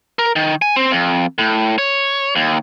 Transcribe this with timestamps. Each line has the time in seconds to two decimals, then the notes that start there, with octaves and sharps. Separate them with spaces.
0.19 A#4
0.36 D#3
0.62 G#5
0.76 C4
0.91 F2
1.38 A2
1.78 C#5
2.36 D#2